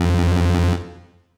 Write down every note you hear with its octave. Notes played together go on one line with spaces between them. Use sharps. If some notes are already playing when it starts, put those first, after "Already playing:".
Already playing: F2